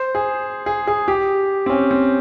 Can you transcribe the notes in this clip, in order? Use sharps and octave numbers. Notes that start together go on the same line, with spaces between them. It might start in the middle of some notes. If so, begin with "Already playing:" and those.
Already playing: C5
G#4
G#4
G#4
G4
C4
C#4
C4